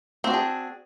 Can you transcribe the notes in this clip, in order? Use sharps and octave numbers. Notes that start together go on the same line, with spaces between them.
C4 D4 F#4 G#4